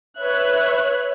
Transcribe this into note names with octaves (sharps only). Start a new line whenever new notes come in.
B4 C#5 E5 F#6